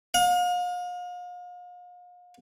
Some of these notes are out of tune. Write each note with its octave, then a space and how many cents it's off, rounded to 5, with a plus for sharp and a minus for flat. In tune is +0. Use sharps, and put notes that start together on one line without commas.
F5 +40